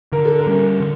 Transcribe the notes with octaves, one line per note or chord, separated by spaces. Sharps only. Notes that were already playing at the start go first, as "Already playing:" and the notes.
D3 A#4
A4
A#4
G3 A#3 C#4
D3